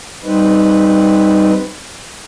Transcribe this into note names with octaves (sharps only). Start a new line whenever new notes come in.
G3 C4 D#4 B4